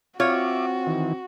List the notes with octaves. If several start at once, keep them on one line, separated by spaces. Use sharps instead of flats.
C4 F4 F#4 C#5 E5 D6
D#3 E3